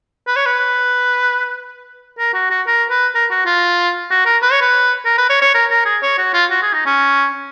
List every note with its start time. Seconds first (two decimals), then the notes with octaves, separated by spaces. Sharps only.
0.27 B4
0.36 C#5
0.46 B4
2.18 A#4
2.34 F#4
2.50 F#4
2.67 A#4
2.90 B4
3.14 A#4
3.30 F#4
3.46 F4
4.10 F#4
4.25 A#4
4.42 B4
4.51 C#5
4.61 B4
5.05 A#4
5.18 B4
5.29 C#5
5.42 C#5
5.54 A#4
5.70 A#4
5.85 G#4
6.02 C#5
6.18 F#4
6.34 F4
6.50 F#4
6.62 G#4
6.73 D#4
6.85 C#4